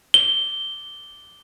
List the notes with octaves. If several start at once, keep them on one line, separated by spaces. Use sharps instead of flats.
G7